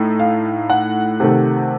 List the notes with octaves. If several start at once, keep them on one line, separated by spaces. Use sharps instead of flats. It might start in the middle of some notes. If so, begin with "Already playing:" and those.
Already playing: A2 A3 D#4
F5
F#5
C3 D#3 A3